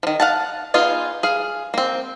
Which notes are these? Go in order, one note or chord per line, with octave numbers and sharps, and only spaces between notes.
D#3 F3
F5 F#5 A5
B3 D#4 F4 G#4
G#4 F5
A#3 C4